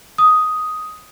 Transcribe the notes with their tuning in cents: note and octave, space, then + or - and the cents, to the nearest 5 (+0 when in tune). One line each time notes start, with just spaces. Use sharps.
D#6 +5